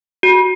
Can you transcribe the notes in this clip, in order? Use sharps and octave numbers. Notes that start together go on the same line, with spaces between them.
F#4